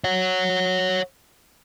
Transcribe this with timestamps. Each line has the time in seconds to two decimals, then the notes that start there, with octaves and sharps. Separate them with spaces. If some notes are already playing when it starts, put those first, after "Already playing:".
0.04 C#5 F#5